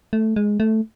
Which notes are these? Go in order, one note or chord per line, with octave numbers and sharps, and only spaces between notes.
A3
G#3
A3